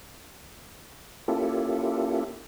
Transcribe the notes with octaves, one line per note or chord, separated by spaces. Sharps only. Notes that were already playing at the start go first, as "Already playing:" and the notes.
A#3 C#4 E4 F4 G4 A4